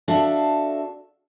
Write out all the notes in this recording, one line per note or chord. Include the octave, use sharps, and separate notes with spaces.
D4 F#4 A4 E5 F5